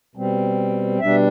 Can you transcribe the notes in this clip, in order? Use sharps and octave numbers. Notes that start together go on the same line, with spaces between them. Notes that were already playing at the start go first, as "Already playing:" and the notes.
B2 G3 C4
B2 G3 D4 E5